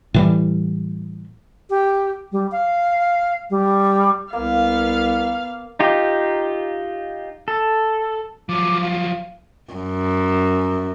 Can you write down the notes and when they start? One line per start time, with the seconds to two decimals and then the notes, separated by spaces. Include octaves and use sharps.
0.14 A2 E3 G3
1.70 G4
2.32 G3
2.52 F5
3.50 G3
4.33 C2 A#3 B3 F5
5.79 D#4 F4 G4
7.48 A4
8.49 F3 F#3 D6
8.82 F5
9.73 F#2